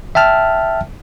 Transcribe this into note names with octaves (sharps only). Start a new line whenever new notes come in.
E5 G5 A5 F6